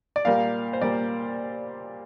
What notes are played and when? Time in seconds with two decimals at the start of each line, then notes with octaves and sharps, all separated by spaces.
0.16 D5
0.25 A#2 G3 A#3 F5
0.73 C5
0.81 A#2 G3 A#3 D5